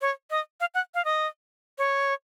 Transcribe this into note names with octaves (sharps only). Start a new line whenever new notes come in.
C#5
D#5
F5
F#5
F5
D#5
C#5